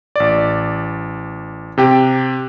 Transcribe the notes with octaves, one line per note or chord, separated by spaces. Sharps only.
A1 D5
C3 G4 G5